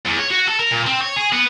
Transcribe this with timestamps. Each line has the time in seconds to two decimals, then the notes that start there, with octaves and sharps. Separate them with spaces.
0.06 E2
0.19 C#5
0.31 F#4
0.48 A4
0.59 A#4
0.71 A#2
0.86 C4
1.01 C#5
1.16 G#4
1.33 B3